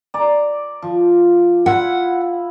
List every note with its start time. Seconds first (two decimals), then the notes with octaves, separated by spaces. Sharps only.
0.14 D5 A#5
0.82 F3
1.66 E4 F4 F#5